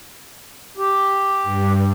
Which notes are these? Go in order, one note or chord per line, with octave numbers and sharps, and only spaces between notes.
G4
G2